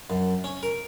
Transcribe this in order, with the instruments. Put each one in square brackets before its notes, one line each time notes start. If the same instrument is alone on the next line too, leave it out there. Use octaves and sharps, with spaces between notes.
[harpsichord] F#2
C#4
A#4